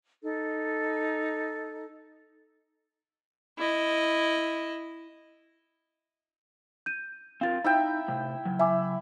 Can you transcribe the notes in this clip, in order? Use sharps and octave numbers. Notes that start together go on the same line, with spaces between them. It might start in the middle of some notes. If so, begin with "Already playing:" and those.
D#4 A4
E4 D#5
G6 D#7
C4 F4 A#4 F5 A6
D#4 E4 E5 G5
A2 C3
C#3 F#3
E4 E5 G#5 D6